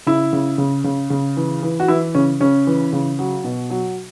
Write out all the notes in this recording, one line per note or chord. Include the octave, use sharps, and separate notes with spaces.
C#3 E4
C#3
C#3
C#3
C#3
E3
E3
F#4
E3 E4
C#3 C#4
C#3 C#4
E3
C#3
F#3
B2
F#3